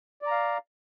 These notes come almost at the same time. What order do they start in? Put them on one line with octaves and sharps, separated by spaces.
D5 A#5 F5